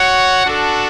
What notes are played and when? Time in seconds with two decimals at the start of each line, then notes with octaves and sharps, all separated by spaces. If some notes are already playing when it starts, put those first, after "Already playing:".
Already playing: F#4 C#5 F#5
0.45 D4 F#4 A4